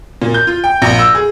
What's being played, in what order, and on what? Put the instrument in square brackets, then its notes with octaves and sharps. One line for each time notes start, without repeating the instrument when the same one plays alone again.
[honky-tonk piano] A#2
G6
F4
G5
A#1
E6
G#4